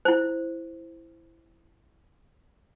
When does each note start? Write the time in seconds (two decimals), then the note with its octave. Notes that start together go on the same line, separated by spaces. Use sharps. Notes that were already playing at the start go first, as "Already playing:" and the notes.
0.05 E4 C5